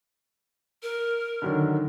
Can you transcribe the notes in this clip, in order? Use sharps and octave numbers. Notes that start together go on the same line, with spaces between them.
A#4
D3 D#3 F#3